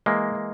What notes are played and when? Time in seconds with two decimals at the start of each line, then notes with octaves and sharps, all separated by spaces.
0.06 E3 G#3 A#3
0.35 E3